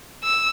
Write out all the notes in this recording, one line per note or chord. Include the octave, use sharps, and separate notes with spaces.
E6